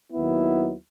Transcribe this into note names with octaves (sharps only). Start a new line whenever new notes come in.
D#2 D#3 F#3 B3 E4